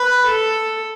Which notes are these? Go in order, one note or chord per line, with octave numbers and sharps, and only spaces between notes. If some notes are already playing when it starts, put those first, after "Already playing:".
Already playing: B4
A4